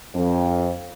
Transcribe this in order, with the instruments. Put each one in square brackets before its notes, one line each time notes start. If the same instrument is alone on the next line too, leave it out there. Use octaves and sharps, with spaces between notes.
[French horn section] F2